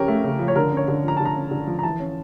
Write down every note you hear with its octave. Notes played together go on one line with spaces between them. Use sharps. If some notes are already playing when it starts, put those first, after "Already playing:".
Already playing: C#3 F3 C#4 G4 A#4
A3
C#3
F3
C#5
D3 A#4
C#4
C#5
D3
F3 A#5
D3 A5
A#5
C#4
D3
F3
A#5
E3 A5
C#4